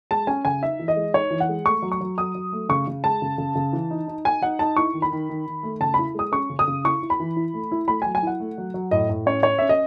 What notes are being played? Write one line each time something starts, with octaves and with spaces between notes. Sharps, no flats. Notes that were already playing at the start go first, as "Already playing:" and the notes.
G#3 A5
C#4 G#5
C#3 G#5
D#4 E5
E3
D#5
G#3
D#4 C#5
E3
F#5
G#3
A3 C#6
F#3
C#6
F#3
F#3 D#6
F#3
A3
C#3 C#6
C#3
G#3 A5
C#3
C#3
C#3
E3
D#4
D#4
D#4 G#5
D#4 F#5
D#4 A5
E4 C#6
D#3
B5
D#3
D#3
D#3
A3
C#3 A5
E4 B5
G#3 D#6
C#4 C#6
C#3
D#6
C#3
E4 C#6
E4
B5
E3
E4
A3
E4
A3 B5
F#3 G#5
G#5
E4 F#5
A3
F#3
F#3
A2 D#5
A2
C#4 C#5
C#4 C#5
C#4 E5
D#5